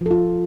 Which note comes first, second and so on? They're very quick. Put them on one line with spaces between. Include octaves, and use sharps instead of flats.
F3 A4 F4